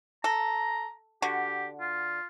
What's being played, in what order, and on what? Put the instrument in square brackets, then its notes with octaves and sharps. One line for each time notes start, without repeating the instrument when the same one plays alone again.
[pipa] A4 [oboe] A#5
[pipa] D3 F#4 [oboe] G4
[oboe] F4